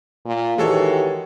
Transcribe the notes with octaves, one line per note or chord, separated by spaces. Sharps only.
A#2
D#3 E3 G#3 F#4 G4 A4 C#5